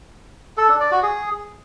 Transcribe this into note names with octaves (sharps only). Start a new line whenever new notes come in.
A4
D4
D5
F#4
G#4